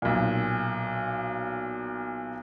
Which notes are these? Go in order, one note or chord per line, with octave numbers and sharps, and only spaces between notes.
B1 A#2